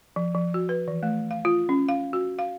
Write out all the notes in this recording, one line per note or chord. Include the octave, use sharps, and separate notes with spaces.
F3
F3
F#4
B4
E3
A3
F5
F4
C#4
F5
F#4
F5